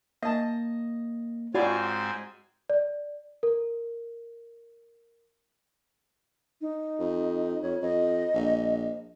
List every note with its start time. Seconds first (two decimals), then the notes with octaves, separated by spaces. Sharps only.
0.23 A#3 D#5 A5
1.54 G#2 C4 F4 F#4 D5 F5 G#5 B5
2.70 D5
3.43 A#4
6.61 D#4
6.99 F2
7.63 F2 C#5
7.82 F2 D#5
8.34 A#1